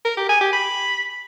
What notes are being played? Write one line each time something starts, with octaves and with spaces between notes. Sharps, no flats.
A#4
G4
G#5
G4
B5